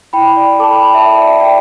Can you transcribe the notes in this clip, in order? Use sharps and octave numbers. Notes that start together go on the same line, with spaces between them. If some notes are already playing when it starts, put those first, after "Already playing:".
E4 G5 B5
D5
A4 A5 D6
G5 B5
A4 G5 B5
E5 A5
D5 E5
D5
A4 E5
D5 G5